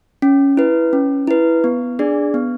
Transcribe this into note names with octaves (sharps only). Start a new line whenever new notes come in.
C#4
E4 B4
C#4
E4 B4
B3
D4 G#4 D5
B3